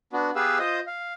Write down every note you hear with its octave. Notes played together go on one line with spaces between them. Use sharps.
B3 D4 F#4
B3 G4 G#4 B4 F5 E6
F4 C5 D#5 D#6
F5